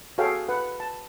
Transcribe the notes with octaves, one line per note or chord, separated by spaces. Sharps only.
F#4 G#4 A4 C#5 F5 G5
B4 F#5
A5